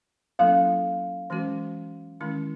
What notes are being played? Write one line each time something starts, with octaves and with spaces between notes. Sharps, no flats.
F#3 A#3 C#4 E4 A4 F5
E3 G#3 C#4 F#4
D#3 G#3 C#4 E4